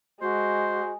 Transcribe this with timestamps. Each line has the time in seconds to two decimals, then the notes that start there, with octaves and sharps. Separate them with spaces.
0.22 G#3 F#4 C5